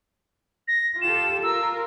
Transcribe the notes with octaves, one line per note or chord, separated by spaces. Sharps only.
A#6
F4 G4 A4 E7
F4 A#4 E6